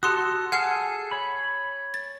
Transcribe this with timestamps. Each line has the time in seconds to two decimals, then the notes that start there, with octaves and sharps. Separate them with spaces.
0.03 F#4 G4 A4 C6 D#6
0.52 G#4 A4 F#5 F6 C7
1.11 C#5 B5
1.94 A6